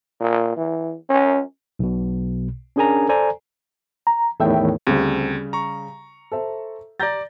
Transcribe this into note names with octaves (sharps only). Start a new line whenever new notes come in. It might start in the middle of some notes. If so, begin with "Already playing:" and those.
A#2
E3
C#4
B1 B2
C#4 D4 G#4 A#4 G#5 A#5
A4 C5 D5 G#5 A#5
A#5
E2 A2 D#3 A4 E5 G5
D2 C#3 G3 C4
A#5 C#6
A4 C5 E5
D5 A#5 G6 A6 A#6